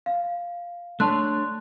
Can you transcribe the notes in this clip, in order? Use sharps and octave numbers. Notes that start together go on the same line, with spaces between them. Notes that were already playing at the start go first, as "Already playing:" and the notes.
F5
A3 D4 C#5 A5 C6 F#6